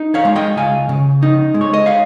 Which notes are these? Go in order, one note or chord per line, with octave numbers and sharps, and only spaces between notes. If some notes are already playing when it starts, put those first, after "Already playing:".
Already playing: D#4
C#5 F5
G#3
D#5 G5
C#2 F5 G#5
C#3
D#4
G#3
C#5
D#5
C#5 F5